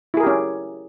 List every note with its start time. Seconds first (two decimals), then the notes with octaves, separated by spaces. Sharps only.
0.14 E4
0.17 G#4
0.20 A#4
0.23 G4
0.27 C#4